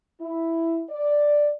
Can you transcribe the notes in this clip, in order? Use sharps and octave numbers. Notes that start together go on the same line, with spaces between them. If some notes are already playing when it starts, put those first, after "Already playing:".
E4
D5